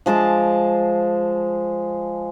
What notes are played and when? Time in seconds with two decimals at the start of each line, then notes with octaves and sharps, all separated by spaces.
0.06 F3 G#3 A5 D6